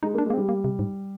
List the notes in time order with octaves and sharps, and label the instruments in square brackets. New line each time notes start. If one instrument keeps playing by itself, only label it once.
[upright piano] G#3 [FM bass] D#4
[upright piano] A#3 [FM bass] D4
[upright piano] G#3 [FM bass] A#3
[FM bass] C4
[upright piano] G3
[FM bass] A#3
C3
G#2